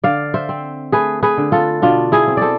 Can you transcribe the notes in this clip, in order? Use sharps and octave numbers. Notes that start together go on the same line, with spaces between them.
D3 D5 F5
C5 E5
C4
A3 G#4 B4
G#4 B4
D3
F4 A4
B2 D4 F4
E4 G#4
C4
A4 C5 D5